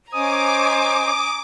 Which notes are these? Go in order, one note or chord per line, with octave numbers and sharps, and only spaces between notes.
C#4 C5 D#5 G#5 A#5 D6 D#6